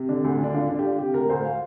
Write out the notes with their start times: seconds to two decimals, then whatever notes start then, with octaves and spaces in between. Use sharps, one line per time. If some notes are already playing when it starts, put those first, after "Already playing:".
Already playing: C3
0.09 D3 D4
0.24 D2
0.39 D3 D4
0.54 D3 F4
0.69 D3 D4
0.79 G4
0.84 D3 F4
0.99 C3 G4
1.14 D2 A#4
1.29 D2 C5
1.45 F5